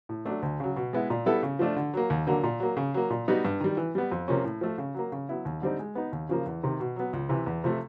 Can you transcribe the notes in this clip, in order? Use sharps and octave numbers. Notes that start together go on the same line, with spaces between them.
A2
F#3 A3 D4
D2
C#3 F#3
B2
G#3 B3 E4
A#2
G3 B3 E4 A4
C#3
F3 A3 D4 F4
D3
F#3 A#3
D#2
D3 F#3 A#3
A#2
F#3 A#3
C#3
F#3 A#3
A#2
G3 B3 D#4 F#4
G2
D#3 G3
E3
G3 B3
F2
C3 F3 A#3 C#4
A2
F3 A3
C#3
F#3 A#3
C#3
F#3 B3 E4
D#2
D3 G3 C4 D#4
G#3
B3 D#4
D#2
C#3 F3 A#3
E2
C3 D#3
B2
F#3 B3
C#2
C3 E3
E2
C3 F3 A3